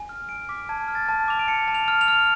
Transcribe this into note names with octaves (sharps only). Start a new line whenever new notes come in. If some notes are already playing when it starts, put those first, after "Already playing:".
Already playing: G#5
F6
G#5 D7
D6 B6
A5 G#6
F6
A6
A5
D6 F7
D7
A5 C#7
A5
F7
F6
F7
F6